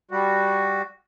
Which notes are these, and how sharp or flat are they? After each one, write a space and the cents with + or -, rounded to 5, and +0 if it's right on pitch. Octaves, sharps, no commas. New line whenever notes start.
G3 +0 F#4 +0